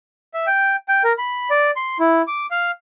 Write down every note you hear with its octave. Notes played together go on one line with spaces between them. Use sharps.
E5
G5
G5
A#4
B5
D5
C6
E4
D6
F5